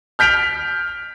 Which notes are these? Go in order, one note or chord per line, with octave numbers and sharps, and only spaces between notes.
F6 G6 B6 D7 F7